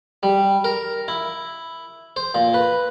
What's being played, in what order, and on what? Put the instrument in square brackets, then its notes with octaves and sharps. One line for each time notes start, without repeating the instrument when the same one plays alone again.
[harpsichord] G3
A#4
E4
C5
A#2
B4